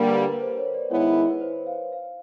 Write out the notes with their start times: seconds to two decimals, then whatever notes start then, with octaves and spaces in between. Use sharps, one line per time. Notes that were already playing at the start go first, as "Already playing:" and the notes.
Already playing: D3 G3 A#3 A#4
0.09 B4
0.15 A#4
0.32 B4
0.41 C5
0.57 C#5
0.74 D5
0.91 D#3 G#3 B3 E4 C#5
1.30 B4
1.41 C5
1.67 F5
1.92 F5